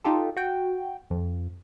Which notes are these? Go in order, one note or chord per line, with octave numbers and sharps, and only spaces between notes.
D#4 F4 G4 A4
F#4 G5
F2